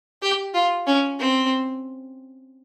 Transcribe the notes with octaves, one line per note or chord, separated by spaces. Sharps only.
G4
F4
C#4
C4